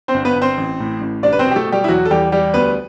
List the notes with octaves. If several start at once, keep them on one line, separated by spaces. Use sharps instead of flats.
C4 C5
G1
B3 B4
G1
C4 C5
A1
A2
A1
C2 D4 D5
B4
C4 C5
B2
G4
A3 A4
B2
G3 G4
E4
E2 F#3 F#4
A4
E2 G3 G4
G3 G4
D2 B3 B4